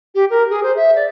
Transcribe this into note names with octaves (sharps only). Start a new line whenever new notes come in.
G4
A#4
G#4
C5
E5
D5